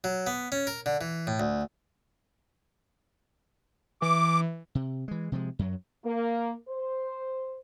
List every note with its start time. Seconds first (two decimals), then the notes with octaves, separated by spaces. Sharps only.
0.04 F#3
0.27 B3
0.52 C#4
0.67 A#4
0.86 D3
1.01 E3
1.27 A2
1.40 D2
4.02 E3 D6
4.75 C3
5.08 E3 G#3
5.32 C3 F3 G#3
5.59 F#2 F#3
6.04 A#3
6.68 C5